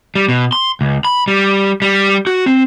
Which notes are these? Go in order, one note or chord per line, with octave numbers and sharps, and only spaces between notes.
G3
B2
C6
C#2
B5
G3
G3
F#4
C4